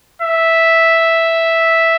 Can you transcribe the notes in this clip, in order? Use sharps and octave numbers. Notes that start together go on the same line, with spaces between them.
E5